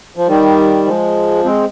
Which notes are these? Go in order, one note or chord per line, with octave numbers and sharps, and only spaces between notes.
F3
D#3 G3
F3 G#3
G#3 C4